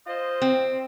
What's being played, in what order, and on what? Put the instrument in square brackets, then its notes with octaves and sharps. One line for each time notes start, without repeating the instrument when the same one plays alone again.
[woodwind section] F4 C5 D#5
[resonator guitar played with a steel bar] C4